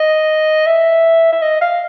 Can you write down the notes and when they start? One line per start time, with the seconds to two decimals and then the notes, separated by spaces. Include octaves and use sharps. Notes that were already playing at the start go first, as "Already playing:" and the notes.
Already playing: D#5
0.66 E5
1.33 E5
1.42 D#5
1.61 F5